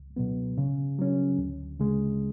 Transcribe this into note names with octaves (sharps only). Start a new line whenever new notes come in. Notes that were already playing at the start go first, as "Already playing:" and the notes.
Already playing: C#2
B2 F#3 B3
C#3
F#3 C#4
D2
C#3 G#3